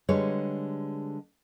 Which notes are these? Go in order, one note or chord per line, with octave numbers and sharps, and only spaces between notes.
D3 G3 G#3 G#4 B4 C#5